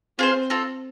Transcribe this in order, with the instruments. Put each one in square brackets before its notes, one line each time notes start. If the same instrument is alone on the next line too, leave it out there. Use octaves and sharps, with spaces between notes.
[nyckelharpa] C4 [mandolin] F4 G#4 C5
[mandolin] C4 F4 A4